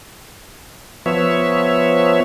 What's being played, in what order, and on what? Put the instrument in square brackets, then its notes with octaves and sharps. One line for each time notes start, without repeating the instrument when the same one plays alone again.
[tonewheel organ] F3 B3 C#5 E5